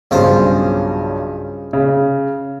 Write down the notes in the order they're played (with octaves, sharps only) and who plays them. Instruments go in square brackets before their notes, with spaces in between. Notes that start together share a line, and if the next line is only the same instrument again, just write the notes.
[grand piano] B1 G2 [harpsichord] C#3 F4 C5
[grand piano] C#3